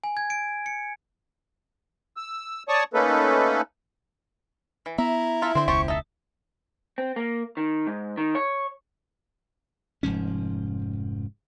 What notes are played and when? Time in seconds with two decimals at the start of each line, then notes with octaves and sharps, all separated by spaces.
0.04 G#5
0.17 G#6
0.30 D7
0.66 C#7
2.17 E6
2.68 C#5 D5 A5 C#6 D#6
2.94 A3 A#3 C#4 D#4 A4 B4
4.86 E3
4.98 B3 E4 E5 A#5
5.42 F4 A4 E5
5.55 D3 C4 C5 C6
5.68 E1 C#2 G4 C5 A5 C#6
5.88 D#4 A4 E5
6.98 C4
7.16 A#3
7.57 D#3
7.87 G#2
8.17 D#3
8.35 C#5
10.03 F1 G#2 F3 C#4